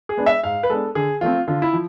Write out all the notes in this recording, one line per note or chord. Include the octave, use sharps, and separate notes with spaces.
G#4
G#3 B3 D4
E5
G#2 F5
B4
G#3 B3 D4 A4
D3 G#4
F3 A3 C4 F4
D3 F4
E4
F3